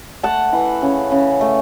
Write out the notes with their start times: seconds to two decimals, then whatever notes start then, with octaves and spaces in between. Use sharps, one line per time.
0.23 A3 F#5 A5
0.53 E3
0.82 C#3
1.12 C#3
1.41 A3